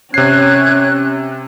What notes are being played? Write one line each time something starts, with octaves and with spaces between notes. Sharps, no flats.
C3 C#4 C#5 F#6 G#6 C7